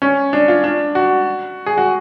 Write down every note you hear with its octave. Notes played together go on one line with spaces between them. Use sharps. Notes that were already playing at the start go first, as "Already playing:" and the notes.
C#4
D4
F4
D4
F#4
G#4
F#4